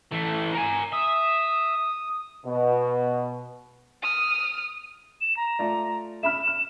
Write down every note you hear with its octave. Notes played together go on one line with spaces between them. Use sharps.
E3 A3
A#4 G#5
E5 D#6
B2
D#6 F6
E7
A#5
A3 F4 D5
E5 B5 F6 E7
F6